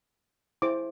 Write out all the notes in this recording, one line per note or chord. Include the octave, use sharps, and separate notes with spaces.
E4 G#4 C5 D6